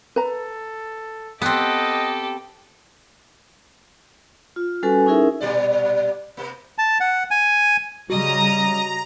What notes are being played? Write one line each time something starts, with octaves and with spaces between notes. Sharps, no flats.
A4 B4 A#5
B3 C4 G4 A4 D#5
F4
G3 C#4 F#4 A4 B4 G#5
C#4 D#4 E4 G#4 A#4 E5
A#2 G3 D5
C3 A#3
A5
F#5
G#5
C#3 G3 F#4 D#5 A#5 D#6